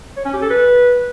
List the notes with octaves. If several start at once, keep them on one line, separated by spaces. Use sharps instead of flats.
C#5
C#4
G4
A4
B4